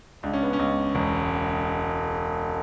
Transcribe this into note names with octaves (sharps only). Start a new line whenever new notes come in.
C#2 D4
C#4
B3
C#4
C#2
E1